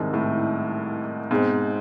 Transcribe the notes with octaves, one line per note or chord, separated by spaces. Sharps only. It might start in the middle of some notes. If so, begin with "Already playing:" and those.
Already playing: C2 G#2 C3 D#3
A2
G#2 B2 G#3 C4